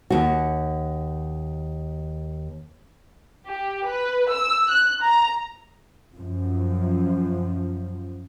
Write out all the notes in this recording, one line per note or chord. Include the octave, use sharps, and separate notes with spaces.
D#2 F#4
G4
B4
E6
F#6
A#5
F#2 F3